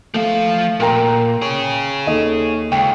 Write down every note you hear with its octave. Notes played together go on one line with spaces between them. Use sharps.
F3 A3 F5
A#2 A#4 G5 A#5
G#4 C#5
D#2 A4 D#5
C#2 G5